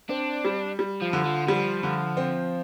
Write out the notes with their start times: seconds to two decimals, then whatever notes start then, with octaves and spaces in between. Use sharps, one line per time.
0.09 C4 D4
0.45 G3
0.79 G3
1.02 F3
1.13 D3
1.25 F3
1.48 F3 G3
1.83 D3
2.17 C4